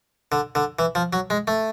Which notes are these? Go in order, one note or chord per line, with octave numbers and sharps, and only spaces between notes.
D3
D3
E3
F3
F#3
G#3
A3